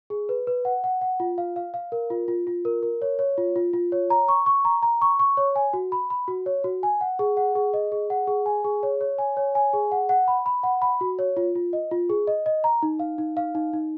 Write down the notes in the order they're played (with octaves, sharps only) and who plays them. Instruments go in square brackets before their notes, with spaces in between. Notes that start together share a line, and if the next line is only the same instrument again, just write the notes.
[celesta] G#4
B4
B4
F#5
F#5
F#5
F4
F5
F5
F5
A#4
F4
F4
F4
A#4
A#4
C#5
C#5
F4
F4
F4
C#5
A#5
C#6
C#6
A#5
A#5
C#6
C#6
C#5
G#5
F#4
B5
B5
F#4
C#5
F#4
G#5
F#5
G#4
F#5
G#4
D#5
G#4
F#5
G#4
G#5
G#4
C#5
C#5
G#5
C#5
G#5
G#4
F#5
F#5
B5
B5
F#5
B5
F#4
C#5
F4
F4
D#5
F4
G#4
D#5
D#5
A#5
D#4
F5
D#4
F5
D#4
D#4